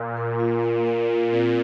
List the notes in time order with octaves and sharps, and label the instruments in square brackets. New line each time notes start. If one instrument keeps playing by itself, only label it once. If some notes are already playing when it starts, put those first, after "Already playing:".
Already playing: [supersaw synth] A#2 [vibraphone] F5
[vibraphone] A#4
F4
A#4
A#4
F4
[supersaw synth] A#2 [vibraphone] C4